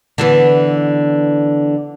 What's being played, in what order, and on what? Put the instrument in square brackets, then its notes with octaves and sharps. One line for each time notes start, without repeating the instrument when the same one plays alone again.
[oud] D3 E3 B3